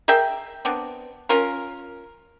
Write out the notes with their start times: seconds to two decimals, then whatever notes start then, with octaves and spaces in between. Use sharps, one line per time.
0.08 G#4 A#4 E5 G5
0.65 B3 C4 D4
1.29 C#4 F4 A#4